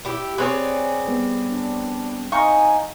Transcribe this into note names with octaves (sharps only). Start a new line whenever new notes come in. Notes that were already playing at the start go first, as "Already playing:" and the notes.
E4 G4
C4 G#4 B4 C#5 D5
G3 B3
D4
D#4 D#5 F5 G#5 A#5 C#6